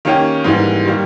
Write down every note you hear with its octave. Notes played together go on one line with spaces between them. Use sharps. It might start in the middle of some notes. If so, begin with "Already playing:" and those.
D#3 A#3 C#4 G4
G#2 E3 G3 A#3
D#3 G3 A#3